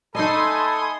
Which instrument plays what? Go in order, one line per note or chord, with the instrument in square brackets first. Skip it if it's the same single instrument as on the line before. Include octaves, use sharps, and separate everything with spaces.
[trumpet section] A3 A4 [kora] D#4 D#5 [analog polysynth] G#5 C6 D#6 [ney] B5